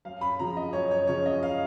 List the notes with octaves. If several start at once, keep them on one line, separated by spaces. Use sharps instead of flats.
F#2 F5
B5
C#3 F3 A#5
D#5
F#2 C#5
C#5
C#3 F3 C#5
D#5
F5